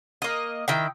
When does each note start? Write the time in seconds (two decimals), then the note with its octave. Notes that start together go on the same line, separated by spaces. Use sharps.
0.22 A#3 D#5
0.68 D#3 E4 G5